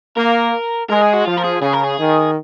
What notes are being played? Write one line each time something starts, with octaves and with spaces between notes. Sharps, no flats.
A#3 A#4
G#3 A#4
G#4
F#4
F3 F4
A#4
G#4
C#3 G#4
A#4
G#4
D#3